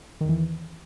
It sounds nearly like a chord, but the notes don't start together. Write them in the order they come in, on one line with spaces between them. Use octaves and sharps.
D#3 E2 E3